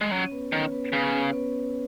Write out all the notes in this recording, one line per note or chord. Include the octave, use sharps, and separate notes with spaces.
G#3
F#3 C#4 C#5
B3 B4
D#3 C#4 C#5
B3 B4
C#3 B3 B4
C#4 C#5
B3 B4